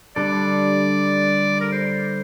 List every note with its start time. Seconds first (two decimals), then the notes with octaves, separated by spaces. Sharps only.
0.16 D3 G3 D4 A4 D5
1.61 A#4
1.72 C5